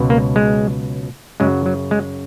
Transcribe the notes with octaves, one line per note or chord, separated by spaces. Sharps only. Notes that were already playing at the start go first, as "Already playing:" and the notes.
Already playing: C#2 B2 F#3
A#3
G#3
F#2 C#3 F#3 G#3
F#3
G#3